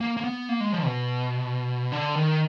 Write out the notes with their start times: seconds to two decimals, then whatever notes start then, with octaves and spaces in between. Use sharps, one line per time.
0.01 A#3
0.17 A#3
0.24 B3
0.49 A#3
0.60 G#3
0.73 F3
0.85 B2
1.92 D3
2.16 D#3